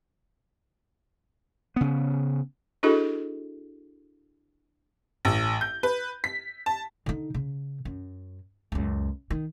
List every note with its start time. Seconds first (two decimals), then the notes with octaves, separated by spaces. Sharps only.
1.76 C#3 B3
2.83 D4 E4 F#4 G#4 A4 D#5
5.25 A1
5.61 G6
5.83 B4
6.24 B6
6.66 A5
7.06 D3 D#4
7.34 C#3
7.85 F#2
8.72 C#2 F#2
9.30 D#3